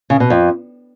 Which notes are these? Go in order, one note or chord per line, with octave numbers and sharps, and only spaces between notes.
C#3
B2
F2